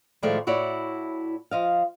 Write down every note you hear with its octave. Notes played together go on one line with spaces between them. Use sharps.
A2 D#3 F3 G#3 A3 D5
A2 E4 F#4 C#5 D5
F3 D#5 F5